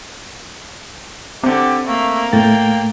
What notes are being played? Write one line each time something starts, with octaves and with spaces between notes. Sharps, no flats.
D3 C4 G4
A3 A#3
A2 A3 G5 A6